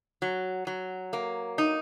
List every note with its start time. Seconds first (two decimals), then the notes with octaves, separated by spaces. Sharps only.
0.22 F#3
0.67 F#3
1.13 A#3
1.58 D#4